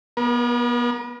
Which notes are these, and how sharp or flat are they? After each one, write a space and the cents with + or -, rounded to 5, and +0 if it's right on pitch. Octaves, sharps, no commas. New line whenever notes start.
B3 -30 A#4 +40